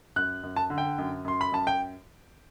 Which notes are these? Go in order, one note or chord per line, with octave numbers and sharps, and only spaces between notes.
F#2 F#6
F#2
A5
D3
G5
F#2
F#2 C6
B5
F#2 A5
G5